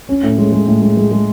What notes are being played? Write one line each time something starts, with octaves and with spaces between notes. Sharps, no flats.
C#4
A2
G#3
G#3
A2
G#3
G#3
G#3